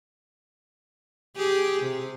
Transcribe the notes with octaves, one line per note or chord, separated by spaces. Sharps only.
G4 G#4
C3